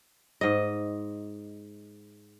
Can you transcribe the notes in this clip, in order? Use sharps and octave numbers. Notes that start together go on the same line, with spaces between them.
G#2 D#5